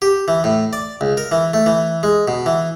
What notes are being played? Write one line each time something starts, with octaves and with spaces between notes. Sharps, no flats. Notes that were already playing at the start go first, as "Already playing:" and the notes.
G4
E3
A2
D5
C#2
A#4
E3
A3
E3
G#3
B2
E3